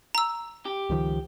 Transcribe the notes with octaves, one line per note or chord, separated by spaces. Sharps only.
A#5 E6
G4
C#2 D#3 F3